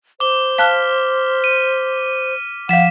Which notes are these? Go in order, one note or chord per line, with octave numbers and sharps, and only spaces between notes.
C5 D6 G7
F5 A5 F6 F#6 B6
D#7
F3 F5 F#5 B6 E7